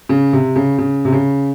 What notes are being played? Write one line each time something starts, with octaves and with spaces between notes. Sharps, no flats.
C#3
C3
C#3
C#3
C3
C#3